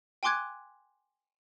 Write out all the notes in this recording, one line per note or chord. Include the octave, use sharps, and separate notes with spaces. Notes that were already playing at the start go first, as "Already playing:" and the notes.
G5 G#5 C6 D6 F#6 G#6